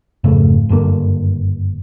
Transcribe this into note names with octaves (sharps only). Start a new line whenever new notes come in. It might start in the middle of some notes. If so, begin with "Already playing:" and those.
F2 G#2 C#3 A3
F#1 G2 D3 A#3